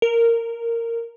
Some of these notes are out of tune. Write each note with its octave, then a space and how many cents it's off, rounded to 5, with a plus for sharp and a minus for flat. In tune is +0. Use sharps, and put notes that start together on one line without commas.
A#4 -10